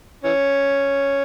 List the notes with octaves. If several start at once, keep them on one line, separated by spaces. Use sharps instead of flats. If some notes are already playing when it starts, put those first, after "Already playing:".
E3 C#4